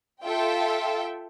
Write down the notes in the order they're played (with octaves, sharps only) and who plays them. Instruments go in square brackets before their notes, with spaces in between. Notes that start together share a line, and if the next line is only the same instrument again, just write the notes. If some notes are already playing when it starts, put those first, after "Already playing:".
[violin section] F4 A4 E5 G5